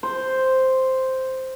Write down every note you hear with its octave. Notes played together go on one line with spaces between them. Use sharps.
C5